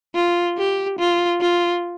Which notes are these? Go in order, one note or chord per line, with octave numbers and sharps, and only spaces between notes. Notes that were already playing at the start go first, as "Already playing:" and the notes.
F4
G4
F4
F4